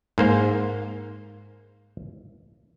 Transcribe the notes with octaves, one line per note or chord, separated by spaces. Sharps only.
G#2 A#3 C5